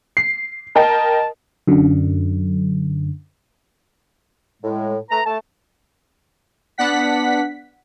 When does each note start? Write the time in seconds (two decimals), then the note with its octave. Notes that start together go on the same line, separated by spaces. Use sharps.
0.17 C7
0.76 A#4 D#5 G5 A5
1.67 F#2 D3
4.62 A2 G#3
5.10 A3 B4 A#5
5.26 A3 A5
6.78 B3 D4 F#5 B6